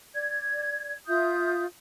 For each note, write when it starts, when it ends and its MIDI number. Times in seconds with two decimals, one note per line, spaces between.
0.14 0.95 74
0.14 0.95 92
1.07 1.64 65
1.07 1.64 76
1.07 1.64 87
1.07 1.64 91